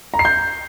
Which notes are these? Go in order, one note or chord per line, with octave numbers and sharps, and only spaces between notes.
A#5
C7
G6